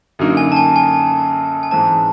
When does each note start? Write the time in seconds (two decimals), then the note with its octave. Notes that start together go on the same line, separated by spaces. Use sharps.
0.19 F#2 D3 F#3 A#3 D#4
0.37 G#5
0.52 A5
0.56 G#5
0.76 G#5
1.63 G#5
1.71 G#2 E3 G#3 C4 A5